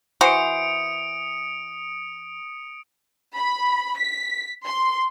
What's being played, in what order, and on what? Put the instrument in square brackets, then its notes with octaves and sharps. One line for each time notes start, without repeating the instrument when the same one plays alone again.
[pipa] E3 F#4 C5 [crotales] D#6 C#7 D7
[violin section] B5
B6
C6